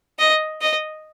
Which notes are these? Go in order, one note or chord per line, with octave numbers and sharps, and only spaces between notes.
D#5
D#5